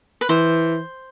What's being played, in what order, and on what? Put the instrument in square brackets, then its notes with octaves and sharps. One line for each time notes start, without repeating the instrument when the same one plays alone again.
[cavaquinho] B4
[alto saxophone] E3 [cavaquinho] C5